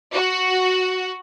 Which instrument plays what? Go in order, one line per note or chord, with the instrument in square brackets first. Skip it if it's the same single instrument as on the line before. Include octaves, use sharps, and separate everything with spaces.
[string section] F#4